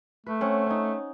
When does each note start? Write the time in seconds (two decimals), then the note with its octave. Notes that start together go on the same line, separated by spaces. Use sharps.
0.26 A3 B4
0.41 C4 C#4 F#5
0.66 C#4 D#4